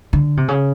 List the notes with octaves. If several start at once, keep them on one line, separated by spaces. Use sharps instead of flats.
D3
C3
C#3